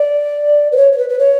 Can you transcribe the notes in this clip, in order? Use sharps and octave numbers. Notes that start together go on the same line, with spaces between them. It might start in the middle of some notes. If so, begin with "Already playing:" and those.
Already playing: D5
B4
C#5
C#5
B4
B4
C#5